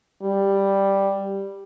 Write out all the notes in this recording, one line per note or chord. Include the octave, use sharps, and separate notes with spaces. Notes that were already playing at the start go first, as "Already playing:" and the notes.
G3